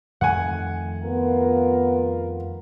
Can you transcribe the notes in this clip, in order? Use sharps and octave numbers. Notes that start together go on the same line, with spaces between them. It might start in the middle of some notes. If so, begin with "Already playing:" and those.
F2 D#3 A3 F#5 G#5
B3 F4 A#4